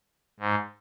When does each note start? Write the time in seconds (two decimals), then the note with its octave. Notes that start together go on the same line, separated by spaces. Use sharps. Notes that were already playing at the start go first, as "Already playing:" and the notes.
0.40 G#2